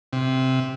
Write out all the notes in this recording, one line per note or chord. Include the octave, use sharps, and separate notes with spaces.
C3